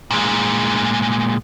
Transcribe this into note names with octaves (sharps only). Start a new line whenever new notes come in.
A#2 G#3